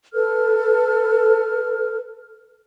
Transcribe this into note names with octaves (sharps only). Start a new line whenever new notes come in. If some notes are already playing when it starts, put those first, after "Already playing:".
A4 B4 F6